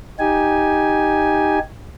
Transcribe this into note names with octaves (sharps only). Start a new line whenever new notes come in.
D#4 G4 G#5